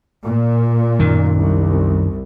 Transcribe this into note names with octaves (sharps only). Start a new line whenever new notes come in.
A#2
F#2 D#3
C2